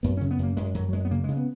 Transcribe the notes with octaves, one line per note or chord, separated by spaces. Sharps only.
F#2 B3
C#3 C#4
B3
F#2 A#3
F#2 G#3
F#2 F#3
F#3
F#2 G#3
B3
C#3 A#3
G#3
C#3
B3